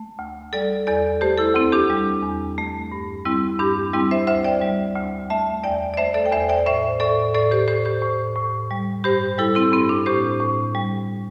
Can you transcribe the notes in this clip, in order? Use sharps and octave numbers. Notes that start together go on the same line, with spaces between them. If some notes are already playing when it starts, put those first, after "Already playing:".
Already playing: A3
D2
G3 A4 D5
E2 A4 D5
A3 G4 C5
E4 A4
D2 C4 E4
D4 G4
G3
E2
A3
G2
G3 C4 E4
G2 D4 G4
G3 C4 E4
C5 E5
D2 C5 E5
D5 G5
G3
D2
A3 E5 A5
E2 D5 G5
D5
A3 C5 E5
A4 D5
G5
E2 C5 E5
D5 G5
A2 C5 E5
A2 A4 D5
A2 A4 D5
G4 C5
A2 G4 C5
G4 C5
A2
A2
G3
G2 G4 C5
G3 E4 A4
C4 E4
G2 C4
D4
A2 G4 C5
A2
G3